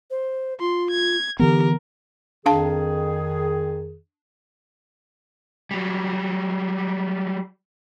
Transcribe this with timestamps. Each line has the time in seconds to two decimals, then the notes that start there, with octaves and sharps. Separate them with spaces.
0.11 C5
0.60 F4 C6
0.91 G#6
1.39 D3 E3 B3 G4 A#4
2.46 F2 D#3 D4 G#4 F5 A5
5.71 F#3 G3